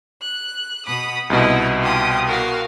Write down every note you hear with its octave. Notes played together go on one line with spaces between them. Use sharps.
F#6
B2 B5 D#6
C2 B2 D#4 E4
F4 G4 D#6
F#4 A#4 F5